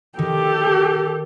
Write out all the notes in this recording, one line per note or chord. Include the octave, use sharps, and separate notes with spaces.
D#3 G4 A4